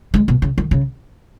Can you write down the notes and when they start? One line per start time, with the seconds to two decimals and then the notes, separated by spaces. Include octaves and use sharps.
0.14 G#3
0.28 B2
0.42 C#3
0.58 D#3
0.71 C#3